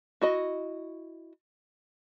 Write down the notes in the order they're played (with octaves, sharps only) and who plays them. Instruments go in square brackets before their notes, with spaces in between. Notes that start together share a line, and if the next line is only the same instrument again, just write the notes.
[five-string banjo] E4 F#4 D#5